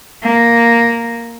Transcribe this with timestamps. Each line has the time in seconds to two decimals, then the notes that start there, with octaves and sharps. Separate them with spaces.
0.23 A#3